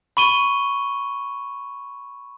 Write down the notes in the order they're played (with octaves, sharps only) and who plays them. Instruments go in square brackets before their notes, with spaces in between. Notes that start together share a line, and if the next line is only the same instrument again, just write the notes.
[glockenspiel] B5 C#6 D#7 G7